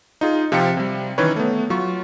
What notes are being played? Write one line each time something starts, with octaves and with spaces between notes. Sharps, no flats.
D#4 F4 G#4
C3 F3 F4 F5 G5 C#7
C3 G3
D#3 E3 C#4 A#4 B4 C#5
A3 B3
F#3 F4 C#6